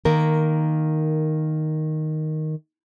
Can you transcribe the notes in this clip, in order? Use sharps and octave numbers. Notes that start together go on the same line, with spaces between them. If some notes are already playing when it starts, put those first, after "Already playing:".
D#3 A#3 A#4